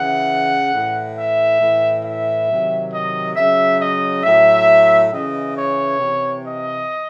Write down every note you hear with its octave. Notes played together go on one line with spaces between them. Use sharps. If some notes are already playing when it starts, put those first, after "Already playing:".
Already playing: C#3 E3 F#5
A2 E3
E5
A2 E3
E5
C3 D#3 F#3
D#5
C#3 F#3 E5
D#5
A2 F#3 E5
C#3 E3 D#5
C#5
C3 E3
D#5